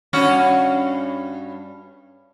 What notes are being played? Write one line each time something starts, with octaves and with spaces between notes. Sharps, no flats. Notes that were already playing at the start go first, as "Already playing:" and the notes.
G2 C#4 F#4